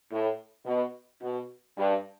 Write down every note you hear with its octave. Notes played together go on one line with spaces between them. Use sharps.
A2
B2
B2
G2